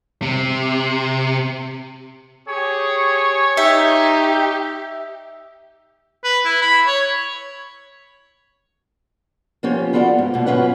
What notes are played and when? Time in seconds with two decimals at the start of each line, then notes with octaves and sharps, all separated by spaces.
0.22 C3
2.48 G4 G#4 C#5
3.57 D#4 G4 E5
6.24 B4
6.45 E4
6.62 B5
6.87 C#5
9.63 F3 B3 C#4 F4 G4
9.93 B3 F4 F#4 A4 D5
10.18 G#2
10.34 G#2 B2
10.46 F#2 E3 C#4 F4 B4 F#5